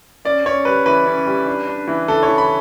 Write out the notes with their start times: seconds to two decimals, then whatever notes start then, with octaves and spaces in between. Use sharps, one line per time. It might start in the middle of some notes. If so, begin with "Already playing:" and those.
0.25 C#4 D5
0.45 C#4 C#5
0.65 G3 B4
0.86 E3 B4
1.06 C#4
1.26 G3
1.46 D4
1.67 D4
1.87 E3
2.08 E3 A4
2.23 C#5
2.28 E3
2.38 B5